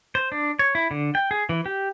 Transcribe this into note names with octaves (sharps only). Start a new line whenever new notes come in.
C5
D4
C#5
E4
D3
G5
G#4
E3
G4